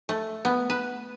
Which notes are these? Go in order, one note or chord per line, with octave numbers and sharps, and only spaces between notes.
A3
B3
B4